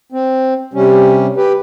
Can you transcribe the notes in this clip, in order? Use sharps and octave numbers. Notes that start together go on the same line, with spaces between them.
C4
C3 G3 C#4
G4 B4